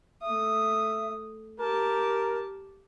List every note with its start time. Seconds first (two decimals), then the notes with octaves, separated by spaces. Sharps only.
0.23 A3 E5 D#6
1.59 G4 A#4 A5